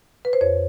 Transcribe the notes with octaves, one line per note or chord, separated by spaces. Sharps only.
B4
C5
F2 C#5